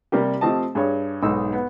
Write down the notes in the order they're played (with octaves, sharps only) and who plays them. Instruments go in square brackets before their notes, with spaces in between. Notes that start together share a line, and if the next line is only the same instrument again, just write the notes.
[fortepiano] C3 G3 A#3 G4
F3 A3 C4 G4 D#5 A5
G2 G#4 C#5
B1 G#2 D#4 E6
B3